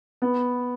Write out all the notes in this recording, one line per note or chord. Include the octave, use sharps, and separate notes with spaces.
B3